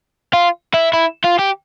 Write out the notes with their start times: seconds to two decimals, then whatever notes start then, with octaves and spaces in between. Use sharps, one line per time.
0.33 F4
0.74 E4
0.93 E4
1.24 F4
1.39 G4